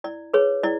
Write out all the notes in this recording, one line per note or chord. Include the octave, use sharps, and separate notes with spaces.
E4 D5
G#4 B4 C#5
E4 D5